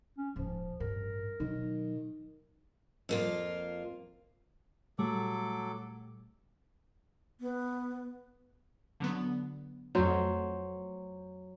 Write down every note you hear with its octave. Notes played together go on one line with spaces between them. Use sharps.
C#4
D#1 G#2 F3
A1 G2 A#4
B2 D#3 F#3
F2 A#3 F4
A#2 F#3 G3 A3 A4 D6
B3
D3 F#3 B3
F2 F#3 A3 C5